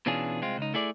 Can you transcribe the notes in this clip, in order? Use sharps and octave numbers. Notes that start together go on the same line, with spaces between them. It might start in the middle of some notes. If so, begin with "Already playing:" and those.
B2 E3 C#4 D4 F4 G#4
C2 G#3 C4 F4
C#2 D#4
A3 E4 G#4 D5